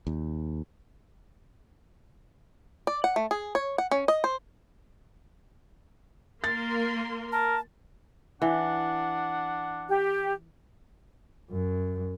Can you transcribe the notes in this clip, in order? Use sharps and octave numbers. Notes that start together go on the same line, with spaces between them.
D#2
D5
F#5
A3
G#4
C#5
F#5
C#4
D#5
C5
A#3 A#4 C6 A6
A#4 A5
E3 D4 F#5
G4
F#2